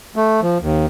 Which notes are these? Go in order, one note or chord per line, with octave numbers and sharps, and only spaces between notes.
A3
F3
D#2